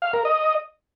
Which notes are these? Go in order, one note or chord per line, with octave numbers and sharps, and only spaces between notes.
F5
A#4
D#5